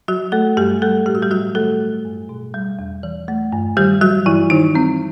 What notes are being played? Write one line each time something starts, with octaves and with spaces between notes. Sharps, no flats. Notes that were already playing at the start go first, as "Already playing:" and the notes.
F#3 F#4
A3 A4
G2 G3 G4
G3 A3 A4
A2 G4
F#4
G3 G4
A2 F#3 F#4
D#3 A3 A4
F#3
G2
B2
G3
E2
E3
A3
G2
D#3 G3 G4
F#3 G3 F#4
G2 E3 E4
D#3 D#4
G3 C4